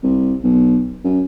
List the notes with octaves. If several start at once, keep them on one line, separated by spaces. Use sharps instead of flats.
C2
B1
F#2